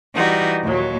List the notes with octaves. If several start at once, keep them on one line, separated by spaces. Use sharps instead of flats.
E3 G3 D#4 F#4
D#2 A#2 F#3